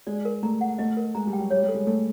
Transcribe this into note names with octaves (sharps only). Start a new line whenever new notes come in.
G#3 D5
A#4
A3 A#5
F#5
A3 D#5
A#4
G#3 A#5
G3
G5
F#3
G3 C#5
G3
A4
G#3
A3 A4